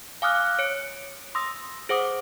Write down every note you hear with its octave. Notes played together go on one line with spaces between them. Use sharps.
F5 G#5 D6 D#6 F6 F#6
C#5 C#7 D7
C6 D#6 E6 A#6
G#4 C5 F#5 D6 D#6